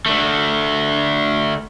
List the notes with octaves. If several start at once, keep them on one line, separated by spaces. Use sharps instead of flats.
D3 A3